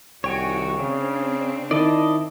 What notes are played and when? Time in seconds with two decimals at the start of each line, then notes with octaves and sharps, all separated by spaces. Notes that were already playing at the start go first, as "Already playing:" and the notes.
0.24 C2 D#3 F#4 C#5 G5 G#5
0.79 C#3 C4 D4
1.71 D#3 E4 D5 D#5 A5